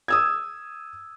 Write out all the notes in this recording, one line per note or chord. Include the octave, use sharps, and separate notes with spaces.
D#6 E6 G#6